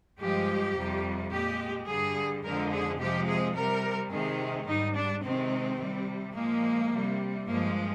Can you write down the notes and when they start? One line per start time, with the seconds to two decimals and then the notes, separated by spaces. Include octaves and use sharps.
0.20 G2 F3 G#3 G4
0.76 F2 C3 G3
1.31 A#2 G#3 G4
1.87 G2 D3 G3 G#4
2.44 F2 D3 F3 G#3 A#4
2.72 G#4
2.99 C3 F3 G#3 G4
3.27 G#4
3.56 C3 G3 A#4
4.11 C3 D#3 G#3 G#4
4.67 G#2 G3 D#4
4.95 D4
5.23 C3 D#3 G#3 C4
5.79 C3 G3
6.35 A#2 F3 G#3 A#3
6.92 C3 G3
7.48 G2 F3 G#3 A#3